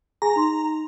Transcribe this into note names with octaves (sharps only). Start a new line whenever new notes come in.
G#4 G#5 A#5
D#4 C6